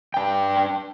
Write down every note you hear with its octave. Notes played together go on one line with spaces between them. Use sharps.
D4 G5